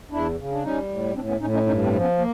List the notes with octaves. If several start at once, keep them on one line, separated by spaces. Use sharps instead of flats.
E2 D4 E4
C#3
D4
G3 C#4 D#4
A2
A2 C4 D4
B3 C#4
A2 C#4 D#4
C#4 D#4
G2 C#4 D#4
C4 D4
F3
B3 C#4
A#3